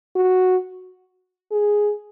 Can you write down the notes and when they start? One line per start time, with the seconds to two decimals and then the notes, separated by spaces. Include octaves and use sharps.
0.16 F#4
1.52 G#4